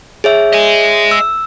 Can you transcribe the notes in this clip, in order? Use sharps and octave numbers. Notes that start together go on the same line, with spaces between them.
G#4 C#5 E5
D#5 G#5
E6